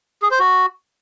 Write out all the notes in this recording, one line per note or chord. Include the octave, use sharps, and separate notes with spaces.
G#4
C5
F#4